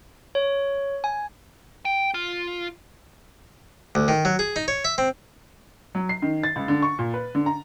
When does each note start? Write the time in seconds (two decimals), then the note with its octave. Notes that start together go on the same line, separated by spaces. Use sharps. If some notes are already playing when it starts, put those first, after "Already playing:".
0.35 C#5
1.04 G#5
1.85 G5
2.14 F4
3.95 D2
4.08 D#3
4.25 F#3
4.39 G#4
4.56 D#4
4.68 C#5
4.85 E5
4.98 C4
5.95 F#3
6.09 C7
6.22 D#3
6.43 A6
6.56 C#2
6.68 D3
6.82 C#6
6.99 A#2
7.14 B4
7.35 D3
7.46 A#5